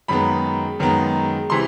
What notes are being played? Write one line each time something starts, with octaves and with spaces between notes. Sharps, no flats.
F#2 D#3 G#3 B3 B5
F#2 D#3 G#3 B3
C3 E3 C6